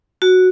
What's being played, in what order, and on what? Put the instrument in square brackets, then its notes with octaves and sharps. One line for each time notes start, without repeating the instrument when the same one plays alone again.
[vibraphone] F#4